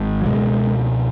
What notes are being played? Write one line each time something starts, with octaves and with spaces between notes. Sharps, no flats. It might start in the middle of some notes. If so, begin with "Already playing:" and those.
Already playing: G#1 G#2
F#3
C#2 B2 G#3